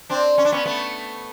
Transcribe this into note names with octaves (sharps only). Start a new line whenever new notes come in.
C4 D4
C#4
D4
B3 C#4
A3 B3